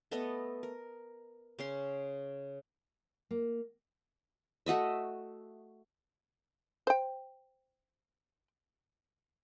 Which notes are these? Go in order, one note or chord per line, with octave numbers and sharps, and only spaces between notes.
A3 B3 A4 D#5
A#4
C#3 C#4 C6
A#3
A3 F#4 D#5 E5
C5 G5